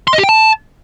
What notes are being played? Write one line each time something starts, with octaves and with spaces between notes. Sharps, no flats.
C6
D#5
G4
G5
A5